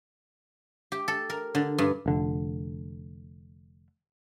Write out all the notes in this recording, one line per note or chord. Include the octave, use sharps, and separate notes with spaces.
G4
A4
A#4
D3
G2
F1 D3